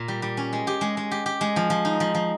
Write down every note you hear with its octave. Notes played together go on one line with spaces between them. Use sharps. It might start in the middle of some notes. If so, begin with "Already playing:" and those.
Already playing: A#2
G3
G3
C#4
G#3
G4
G#3
G#3
G4
G4
G#3
F3
F3
D#4
F3
F3